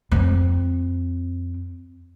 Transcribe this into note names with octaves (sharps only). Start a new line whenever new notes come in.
F2 C4